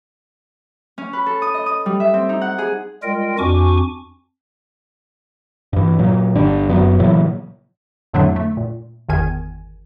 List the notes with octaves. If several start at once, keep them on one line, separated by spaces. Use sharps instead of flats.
C#4
B4
A4
D#6
D#5
D#6
G3
E5
C4
D#4
F#5
G#4
G3 G#3 F4 A#4 D#5 G5
F2 D4 F#4 G#5 C#6 D6
G2 E3
A#2 F#3
G1 G2 D3 D4
F#1 F#2 F#3 B3
A#2 C#3 E3 F#3
F2 A2 D3 F#3 A3 D4
A3
A#2
G1 E2 D#3 G#5 G#6